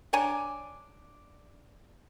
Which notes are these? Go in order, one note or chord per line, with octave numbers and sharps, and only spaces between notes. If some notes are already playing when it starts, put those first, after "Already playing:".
D4 C#5 G#5 A#5